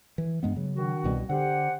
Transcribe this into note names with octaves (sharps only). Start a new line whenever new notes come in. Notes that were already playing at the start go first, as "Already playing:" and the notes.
E3
G2 G#3 B3
C#3 F#3
D#3 D4 F#4
C2 B2 G3
D3 G4 C5 F#5